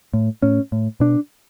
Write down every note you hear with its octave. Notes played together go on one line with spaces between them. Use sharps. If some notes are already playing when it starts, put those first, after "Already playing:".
A2
A2 C#4
A2
B2 D4